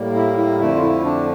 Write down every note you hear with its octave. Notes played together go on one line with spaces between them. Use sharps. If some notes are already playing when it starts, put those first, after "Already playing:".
Already playing: A2 G3 A#3
E4
E4
F2 D3 A3 E4
F4
E4
D4